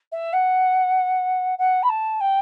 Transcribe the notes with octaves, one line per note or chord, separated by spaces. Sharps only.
E5
F#5
F#5
B5
A5
G5